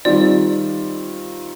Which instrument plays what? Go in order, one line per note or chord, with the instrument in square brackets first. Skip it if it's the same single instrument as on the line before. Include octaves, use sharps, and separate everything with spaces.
[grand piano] D#3 G3 C4 F4 [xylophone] D5